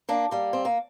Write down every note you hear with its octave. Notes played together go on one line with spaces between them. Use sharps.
A#3 D4
G3 A#3
C4
A#3